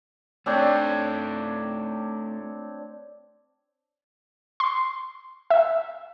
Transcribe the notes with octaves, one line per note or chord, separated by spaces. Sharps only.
A3 C4 D4 F4 C#5
C6
E5